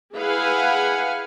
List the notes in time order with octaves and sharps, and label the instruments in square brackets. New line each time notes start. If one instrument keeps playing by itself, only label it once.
[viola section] E4 G#4 B4 F5 F#5 G#5